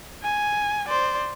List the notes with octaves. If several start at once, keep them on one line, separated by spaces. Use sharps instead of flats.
G#5
C5 D5